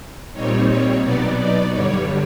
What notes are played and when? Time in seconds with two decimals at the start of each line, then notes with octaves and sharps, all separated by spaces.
0.33 A#2 G3 C4 D#4 C#5
0.68 C#5
1.02 B2 F#3 B3 D#4 D5
1.36 D5
1.71 G2 D3 G3 C#5